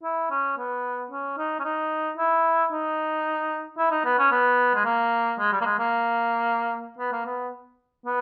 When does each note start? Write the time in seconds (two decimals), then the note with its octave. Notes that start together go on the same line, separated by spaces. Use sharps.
0.03 E4
0.31 C#4
0.58 B3
1.11 C#4
1.38 D#4
1.59 C#4
1.64 D#4
2.17 E4
2.72 D#4
3.78 E4
3.91 D#4
4.05 B3
4.19 C#4
4.31 B3
4.74 G#3
4.85 A#3
5.39 G#3
5.52 G3
5.61 A#3
5.65 G#3
5.79 A#3
6.99 B3
7.12 A#3
7.26 B3
8.06 B3